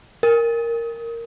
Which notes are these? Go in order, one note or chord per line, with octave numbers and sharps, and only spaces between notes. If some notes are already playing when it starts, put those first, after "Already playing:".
A#4